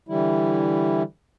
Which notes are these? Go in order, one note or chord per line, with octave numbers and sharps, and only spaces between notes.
D3 E3 G3 E4